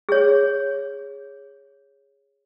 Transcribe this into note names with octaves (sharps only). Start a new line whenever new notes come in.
G#4 C#5